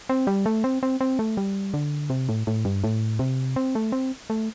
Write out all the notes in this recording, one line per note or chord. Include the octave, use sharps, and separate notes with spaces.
C4
G3
A3
C4
C4
C4
A3
G3
D3
C3
A2
A2
G2
A2
C3
C4
A3
C4
A3